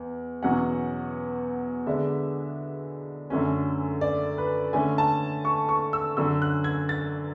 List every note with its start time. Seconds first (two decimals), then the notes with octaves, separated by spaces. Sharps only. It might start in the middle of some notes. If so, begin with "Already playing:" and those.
Already playing: E2
0.43 E2 B2 F#3 C#4 F#5
1.86 D3 G#3 B3 D4 E5
3.30 F#2 D3 A3 C#4
4.01 D5
4.38 B4
4.73 D3 A3 C#4 G#5
4.98 A5
5.45 C#6
5.69 C#6
5.93 E6
6.17 F#2 D3 F#3 C#4 E6
6.42 F#6
6.64 G#6
6.89 A6